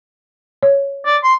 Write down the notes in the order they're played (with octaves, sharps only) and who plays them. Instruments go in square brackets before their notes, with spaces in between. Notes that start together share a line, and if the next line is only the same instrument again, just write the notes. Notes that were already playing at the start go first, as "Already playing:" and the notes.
[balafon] C#5
[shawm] D5
C6